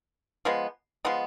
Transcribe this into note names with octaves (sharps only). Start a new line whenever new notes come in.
F3 G#3 B3
F3 G#3 B3